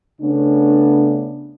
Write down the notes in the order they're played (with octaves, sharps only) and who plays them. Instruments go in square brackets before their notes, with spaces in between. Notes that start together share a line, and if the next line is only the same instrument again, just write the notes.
[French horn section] C#3 A3 B3 C#4 D4